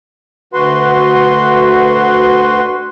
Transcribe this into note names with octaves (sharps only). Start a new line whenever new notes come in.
D2 F#4 B4 C6